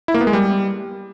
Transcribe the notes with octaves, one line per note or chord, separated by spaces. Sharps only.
E4
A#3
B3
G#3
G3